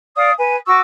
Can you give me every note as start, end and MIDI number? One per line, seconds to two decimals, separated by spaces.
0.16 0.31 74
0.16 0.31 77
0.16 0.31 87
0.38 0.56 71
0.38 0.56 80
0.66 0.80 66
0.66 0.80 85
0.66 0.80 86
0.66 0.80 88